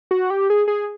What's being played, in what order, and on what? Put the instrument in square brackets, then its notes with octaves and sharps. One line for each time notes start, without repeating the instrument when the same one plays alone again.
[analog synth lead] F#4
G4
G#4
G#4